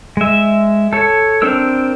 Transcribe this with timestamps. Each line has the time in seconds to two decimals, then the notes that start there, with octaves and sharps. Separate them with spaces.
0.17 G#3 E5
0.93 A4 C#5
1.42 C4 D4 A#4 E6